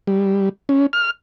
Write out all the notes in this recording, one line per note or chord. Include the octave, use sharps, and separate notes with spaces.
G3
C#4
F6